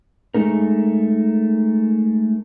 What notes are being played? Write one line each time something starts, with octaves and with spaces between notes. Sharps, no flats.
G#3 A3 D#4 A#4